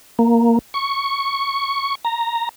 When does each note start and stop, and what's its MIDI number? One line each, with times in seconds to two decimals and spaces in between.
0.19 0.59 58
0.74 1.95 85
2.05 2.49 82